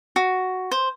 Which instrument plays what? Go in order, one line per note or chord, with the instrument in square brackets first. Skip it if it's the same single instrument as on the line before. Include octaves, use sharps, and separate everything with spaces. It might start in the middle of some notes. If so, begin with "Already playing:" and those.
[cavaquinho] F#4
C5